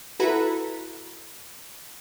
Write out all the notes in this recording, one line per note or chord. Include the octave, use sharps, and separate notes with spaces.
E4 F#4 A4 B4 A#5 B5